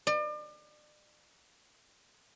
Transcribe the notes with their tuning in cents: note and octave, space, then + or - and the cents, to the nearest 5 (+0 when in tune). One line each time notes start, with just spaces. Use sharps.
D5 +40